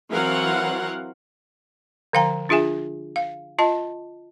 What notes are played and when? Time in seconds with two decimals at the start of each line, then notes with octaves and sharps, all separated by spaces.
0.11 E3 F#3 C4 A#4 F5 F#5
2.13 D3 F3 F5 G5 A#5
2.49 D4 F4 G#4 E5 G#5
3.16 F5
3.59 F4 D#5 A5